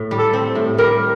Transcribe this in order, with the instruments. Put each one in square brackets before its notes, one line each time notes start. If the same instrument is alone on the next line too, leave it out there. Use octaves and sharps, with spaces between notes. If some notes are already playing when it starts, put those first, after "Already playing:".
Already playing: [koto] A2
G3
[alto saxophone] A4
[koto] C4
A2
[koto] G3 [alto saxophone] A#4